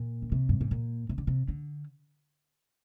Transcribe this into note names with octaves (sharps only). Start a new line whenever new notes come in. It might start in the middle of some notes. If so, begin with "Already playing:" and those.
Already playing: A#2
D3
C3
G2
G#2
A#2
C3
D3
C3
D3